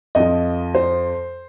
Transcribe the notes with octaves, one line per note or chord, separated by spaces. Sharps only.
F2 F3 D#5
C5